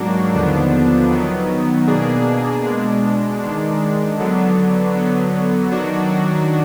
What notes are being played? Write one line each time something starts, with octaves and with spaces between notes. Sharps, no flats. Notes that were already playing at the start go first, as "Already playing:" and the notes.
Already playing: G#2 F#3 A#3 D4 F#4
D#2 D3 F3 B3 D4
D#3 F#3 B3
B2 A#3 D4 G#4
B2 G#3 D4
D#3 G#3 D4
D3 F#3 B3 D4
D3 F#3 B3
D#3 F#3 D4 F#4